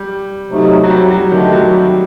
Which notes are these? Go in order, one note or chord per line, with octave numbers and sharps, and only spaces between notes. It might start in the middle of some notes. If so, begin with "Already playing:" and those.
Already playing: G3
C3 F#3 A3 D#4
F#3
G3
F#3
D3 D#3 A3 D4 G4
F#3
G3